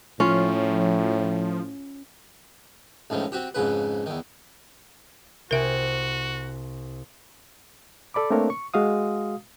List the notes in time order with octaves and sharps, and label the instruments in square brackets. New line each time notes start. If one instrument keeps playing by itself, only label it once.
[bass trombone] A2 [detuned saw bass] F3 [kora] C#4 F4
[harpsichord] C#2 A2 D#3 F3
C4 F#4 G4
F2 G#2 C#3 B4
E2 D#3
[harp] C2 G4 G#5 [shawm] F#4 [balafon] A#4 E5
[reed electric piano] A4 D5 B5 D6
A3 A#3 C4 D4 A#4 C#5
C#6
G#3 F#4 F5 D#6